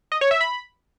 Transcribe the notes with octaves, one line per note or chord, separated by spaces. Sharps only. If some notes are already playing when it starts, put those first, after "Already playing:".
D#5
C#5
E5
B5